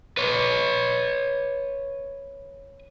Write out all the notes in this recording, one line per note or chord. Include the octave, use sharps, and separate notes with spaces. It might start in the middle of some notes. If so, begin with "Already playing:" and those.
B4 C#5